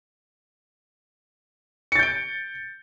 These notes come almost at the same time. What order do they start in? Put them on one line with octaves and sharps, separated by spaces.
C#7 A6 G6 D7